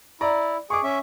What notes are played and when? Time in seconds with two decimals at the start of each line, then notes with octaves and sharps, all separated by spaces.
0.21 E4 D5 A#5
0.70 G#4 C#6 D6
0.83 C#4 E5